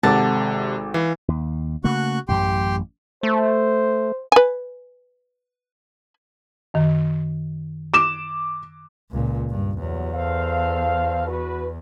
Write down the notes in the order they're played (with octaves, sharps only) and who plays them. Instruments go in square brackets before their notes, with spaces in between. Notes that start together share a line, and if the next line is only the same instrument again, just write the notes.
[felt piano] G#1 A4 D6 [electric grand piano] C3 [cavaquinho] F#5 A5
[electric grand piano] E3 [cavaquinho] F5
[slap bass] D#2
[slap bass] C#3 A3 A#3 [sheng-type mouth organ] F#4 C#6 F#6
[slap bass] A1 F#2 [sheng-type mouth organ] G4 G5 C6
[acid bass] A3 [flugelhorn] C5
[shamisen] B4 G#5
[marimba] F#2 D#3
[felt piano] D6 E7
[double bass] C#2 A#2
G2
[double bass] E2 [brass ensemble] G2 F#3
[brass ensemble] A4 C5 F5
F#4 B4